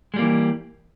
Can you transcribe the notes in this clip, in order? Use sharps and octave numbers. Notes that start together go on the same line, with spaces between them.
E3 G3 G#3 A#3